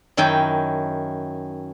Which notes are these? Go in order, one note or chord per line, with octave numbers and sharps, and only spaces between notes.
F#2 D#3 E4 G5